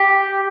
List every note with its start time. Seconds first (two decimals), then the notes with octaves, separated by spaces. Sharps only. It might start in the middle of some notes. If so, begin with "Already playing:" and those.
Already playing: G4